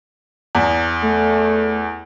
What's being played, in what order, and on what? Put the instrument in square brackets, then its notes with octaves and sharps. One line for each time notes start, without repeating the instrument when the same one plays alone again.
[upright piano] E2
[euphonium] A3